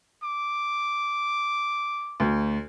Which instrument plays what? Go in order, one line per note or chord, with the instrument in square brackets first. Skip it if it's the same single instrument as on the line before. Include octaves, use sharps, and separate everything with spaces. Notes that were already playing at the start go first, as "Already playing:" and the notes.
[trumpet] D6
[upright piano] D2